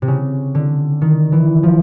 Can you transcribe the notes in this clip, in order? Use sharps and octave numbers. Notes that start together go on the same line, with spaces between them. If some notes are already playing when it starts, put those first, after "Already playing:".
C3
C#3
D3
D#3
E3
F3